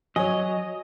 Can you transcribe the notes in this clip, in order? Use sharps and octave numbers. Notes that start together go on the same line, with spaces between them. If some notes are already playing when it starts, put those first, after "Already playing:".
F#3 C#5 D#5 G#5